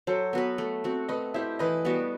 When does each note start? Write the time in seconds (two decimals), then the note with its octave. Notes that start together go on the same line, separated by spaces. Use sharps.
0.07 F#3 A4 C5
0.33 B3 F#4 B4
0.58 A3
0.84 C4 F#4
1.09 A3 B4 D#5
1.34 E4 G4 C5 E5
1.59 E3 B4 D#5
1.85 G3 B3 F#4